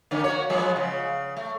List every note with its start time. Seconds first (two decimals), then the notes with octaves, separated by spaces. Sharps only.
0.11 D3 A#3 C#4
0.24 F#4 C#5
0.49 F3 G#3 B3
0.76 C#3
1.37 A3